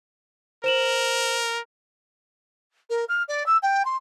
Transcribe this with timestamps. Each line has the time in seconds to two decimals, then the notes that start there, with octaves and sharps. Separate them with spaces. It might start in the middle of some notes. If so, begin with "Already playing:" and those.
0.64 A#4 C5 E7 F#7
2.90 A#4
3.09 F6
3.28 D5
3.46 E6
3.63 G5
3.85 C6